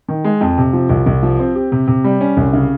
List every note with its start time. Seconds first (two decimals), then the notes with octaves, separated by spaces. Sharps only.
0.09 D#3
0.24 G#3
0.41 F2
0.58 C3
0.73 F3
0.90 C2
1.06 C2
1.23 F3
1.39 C4
1.55 G4
1.72 C3
1.87 C3
2.04 G3
2.21 C#4
2.37 C2
2.53 C#3